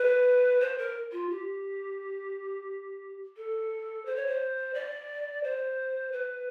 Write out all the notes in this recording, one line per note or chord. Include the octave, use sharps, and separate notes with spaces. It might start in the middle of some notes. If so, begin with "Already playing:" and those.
Already playing: B4
C5
A#4
F4
G4
A4
C5
C#5
C5
D5
C5
B4